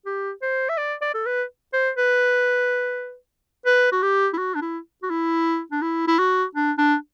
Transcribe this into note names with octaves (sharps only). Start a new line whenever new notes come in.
G4
C5
E5
D5
D5
A4
B4
C5
B4
B4
F#4
G4
E4
F#4
D4
E4
F#4
E4
D4
E4
E4
F#4
D4
D4